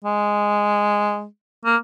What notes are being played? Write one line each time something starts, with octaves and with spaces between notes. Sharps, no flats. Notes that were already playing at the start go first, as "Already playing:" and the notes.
G#3
A#3